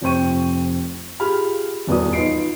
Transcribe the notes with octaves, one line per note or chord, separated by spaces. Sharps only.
F1 F2 C4 G5 C#6 D#7
F4 G4 G#4 B5 F6
D#1 E2 B3 F#4 D5 D#6
D#4 F4 B4 D#5 C7 D7